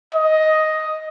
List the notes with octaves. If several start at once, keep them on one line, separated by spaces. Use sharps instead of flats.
D#5